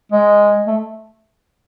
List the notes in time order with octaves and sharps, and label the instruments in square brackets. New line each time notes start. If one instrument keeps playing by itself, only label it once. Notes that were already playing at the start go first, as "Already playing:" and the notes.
[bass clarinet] G#3
A3